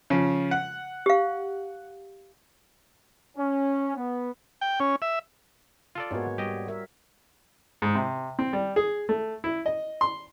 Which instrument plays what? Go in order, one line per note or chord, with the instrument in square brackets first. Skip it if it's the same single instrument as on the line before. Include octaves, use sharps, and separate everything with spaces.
[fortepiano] C#3 F3
F#5
[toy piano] G4 F5
[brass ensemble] C#4
B3
[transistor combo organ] G5
C#4
E5
[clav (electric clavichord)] F4 A4 D5
[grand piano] G#2 A#3 B3 [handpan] F#4 C#5
[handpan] G3 [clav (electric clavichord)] G4 D#5
[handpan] A#4 E5
[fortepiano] G#2
C3
C4
G3
G#4
A3
E4
D#5
C6